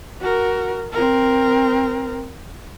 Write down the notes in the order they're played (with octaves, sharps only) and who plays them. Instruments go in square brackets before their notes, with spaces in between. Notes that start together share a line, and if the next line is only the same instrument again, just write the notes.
[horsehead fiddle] F#4 A#4
C4 A#4